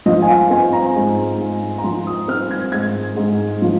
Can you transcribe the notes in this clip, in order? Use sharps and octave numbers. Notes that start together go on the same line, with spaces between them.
F3 D#5
G#5
F5
C4 G#5
A#5
G#2
G#2
A#5
F3 C6
D#6
C4 F6
G#6
G#2 G#6
G#2
F3